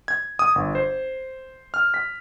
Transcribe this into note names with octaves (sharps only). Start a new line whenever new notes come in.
G#6
D#6
G1
C5
F6
B6